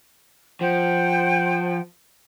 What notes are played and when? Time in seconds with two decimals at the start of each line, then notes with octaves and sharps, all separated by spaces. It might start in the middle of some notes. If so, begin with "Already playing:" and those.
0.61 F3 C5 F#5 G5